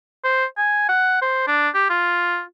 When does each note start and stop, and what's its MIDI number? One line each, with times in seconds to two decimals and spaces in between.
0.24 0.45 72
0.57 0.84 80
0.89 1.18 78
1.22 1.43 72
1.47 1.69 62
1.74 1.85 67
1.90 2.42 65